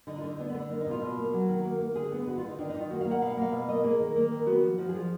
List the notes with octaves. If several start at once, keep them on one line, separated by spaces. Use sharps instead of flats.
D3 D#4
F4
D3 D#4
B3 D4
B3
D3
D4
A#3 D#4
D#4
B2 F4
B2
A#3
F#3 F#4
D#3
A#3
A#3
D3 G#4
B3
D3 F#4
F4
D3 D#4
D#3 D4
D#4
D#3 F4
A#3 F#4
F5
A#3
F#5
B2 F5
F#5
A#3 F5
B2 F5
A#3 D#5
A#3 G#4
D#3
A#3
D#3
B3 F#4
F3
F3 F#4
G#4
F3 F4